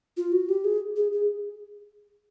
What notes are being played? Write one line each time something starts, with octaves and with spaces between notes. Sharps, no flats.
F4
F#4
G4
G#4
G#4
G#4